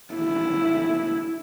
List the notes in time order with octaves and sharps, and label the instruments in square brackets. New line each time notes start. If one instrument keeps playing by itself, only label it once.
[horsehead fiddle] E4